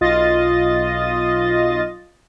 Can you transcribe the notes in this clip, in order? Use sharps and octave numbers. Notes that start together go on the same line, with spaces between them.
B1 F4 D#5 A6